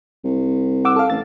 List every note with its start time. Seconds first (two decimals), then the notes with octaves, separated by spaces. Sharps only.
0.24 C2
0.85 F#5 D6 E6
0.96 A4 F5
1.10 A1 A6